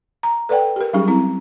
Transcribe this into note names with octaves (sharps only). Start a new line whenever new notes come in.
A#5
A4 B4 D5 F#5 G5
G4 A#4
F#3 G3 C#4 D#4 G4 G#4
C4 E4 A#5